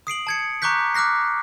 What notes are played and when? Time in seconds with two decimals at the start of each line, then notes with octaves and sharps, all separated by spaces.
0.07 D#6 C7 D7 F#7
0.27 A5 G#6 C#7
0.62 A#5 C#6 D6 F#6 G6 B6
0.94 D6 F6 F#6 A#6 C7